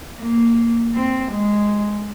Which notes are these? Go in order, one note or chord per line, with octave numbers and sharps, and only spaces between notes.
A#3
C4
G#3